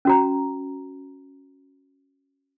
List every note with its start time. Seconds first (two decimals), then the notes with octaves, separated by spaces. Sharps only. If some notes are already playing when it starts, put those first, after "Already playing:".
0.05 C#4 F#4 A#5